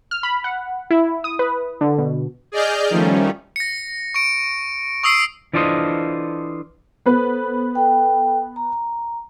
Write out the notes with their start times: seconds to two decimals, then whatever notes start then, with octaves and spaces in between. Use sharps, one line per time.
0.11 F6
0.23 B5
0.44 F#5
0.91 E4
1.24 D#6
1.39 B4
1.81 D3
1.98 B2
2.52 G#4 D5 D#5 F6 G6
2.90 D#3 F3 G3 A3 C#4
3.56 A#6 C#7
4.14 C#6 D7
5.03 C#6 D#6 E6 C7 D7
5.53 E3 D4 F4 A4 C5 D#5
7.06 B3 A4 B4 C5
7.75 A4 G5
8.56 A#5